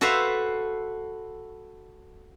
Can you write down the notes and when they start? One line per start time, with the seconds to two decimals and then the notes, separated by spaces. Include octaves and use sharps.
0.01 F#4 A4 B4 C5 E5 F5